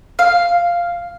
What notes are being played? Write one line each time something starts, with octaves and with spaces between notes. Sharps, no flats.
F5